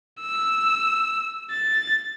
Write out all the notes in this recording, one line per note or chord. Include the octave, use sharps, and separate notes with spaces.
E6
A6